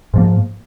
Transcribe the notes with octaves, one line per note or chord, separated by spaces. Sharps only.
G#2 F3 A#3